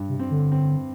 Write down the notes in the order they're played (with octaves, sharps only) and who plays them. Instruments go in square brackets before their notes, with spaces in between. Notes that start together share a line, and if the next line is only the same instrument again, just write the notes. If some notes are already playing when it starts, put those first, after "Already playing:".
Already playing: [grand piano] G2
[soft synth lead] C3
[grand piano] C4
[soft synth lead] D3
[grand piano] C4